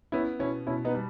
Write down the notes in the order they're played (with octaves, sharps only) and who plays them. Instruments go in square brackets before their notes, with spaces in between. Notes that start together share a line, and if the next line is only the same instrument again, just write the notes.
[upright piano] B3 [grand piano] C#4 E4
[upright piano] B2 [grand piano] C#4 E4
[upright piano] B2 [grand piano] C#4 E4
[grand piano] B3 D#4
[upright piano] G3